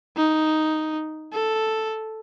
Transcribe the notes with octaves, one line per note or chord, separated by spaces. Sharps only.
D#4
A4